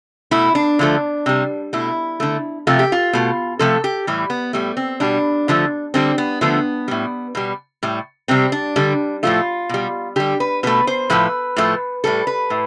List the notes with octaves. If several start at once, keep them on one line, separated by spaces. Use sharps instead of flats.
B2 A3 E4
D4
D3 F3 A3
C3 G3
B2 A3 E4
D3 A3
C3 F3 A3 F4
G4
F4
B2 A3
C3 F3 A3 A4
G4
A2 E3 G3
B3
A2 G3 A3
C4
B2 G3 D4
D3 F3 A3
D3 G3 C4
B3
D3 F3 A3 B3
A2 G3
B2 G3
A2 G3
C3 G3 C4
D4
D3 G3
A2 F3 A3 F4
B2 G3
D3 G3 G4
B4
B2 A3 B4
C5
A2 F3 A3 B4
A2 F3 A3
A2 G3 A4
B4
A2